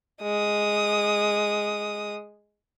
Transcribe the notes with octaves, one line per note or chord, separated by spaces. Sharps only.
G#3 D#6